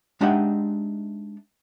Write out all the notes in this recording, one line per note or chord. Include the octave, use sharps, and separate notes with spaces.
G#3 D4 D#4 G4 E5 F#5